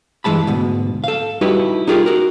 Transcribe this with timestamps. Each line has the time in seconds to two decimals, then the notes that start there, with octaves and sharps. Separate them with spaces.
0.24 G2 E3 G#3 A5 B5
0.47 D2 G#2 B2
1.04 A4 F5
1.41 G3 D#4 E4 F#4 G4 B4
1.87 D#4 F4 G4 G#4 A#4
2.06 F#4 A#4